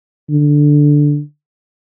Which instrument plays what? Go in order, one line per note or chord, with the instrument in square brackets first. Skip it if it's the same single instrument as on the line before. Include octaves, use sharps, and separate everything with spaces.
[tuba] D3